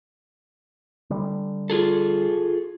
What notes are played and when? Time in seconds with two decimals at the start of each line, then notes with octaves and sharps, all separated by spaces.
1.10 D3 G3
1.70 F4 G#4 A4